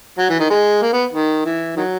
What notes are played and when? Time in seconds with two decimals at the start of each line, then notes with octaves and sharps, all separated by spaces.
0.19 F#3
0.30 E3
0.39 D#3
0.50 G#3
0.82 A#3
0.93 B3
1.13 D#3
1.45 E3
1.76 D#3 F#3